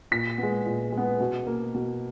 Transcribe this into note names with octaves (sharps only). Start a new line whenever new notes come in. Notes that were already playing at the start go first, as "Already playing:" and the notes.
A#2 B6
G#3 B3
A#2
G#3
B3
B2
A#3
B2